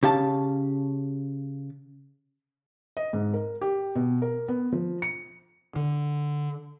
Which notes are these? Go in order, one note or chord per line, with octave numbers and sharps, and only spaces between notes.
C#3 G4 F5 A5
D#5
G#2
A#4
G4
B2
A#4
B3
F3
C#7
D3